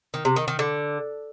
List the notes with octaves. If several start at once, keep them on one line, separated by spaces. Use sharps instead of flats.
D#3
C3
D#3
D#3
D3